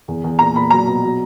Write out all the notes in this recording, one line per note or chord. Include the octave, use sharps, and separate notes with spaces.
E2
E2
A#2 A#5
A#2 B5
F#3 A#5
B2
F#3